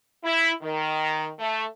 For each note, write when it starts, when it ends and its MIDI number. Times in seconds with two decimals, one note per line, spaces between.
0.24 0.51 64
0.62 1.28 51
1.39 1.65 57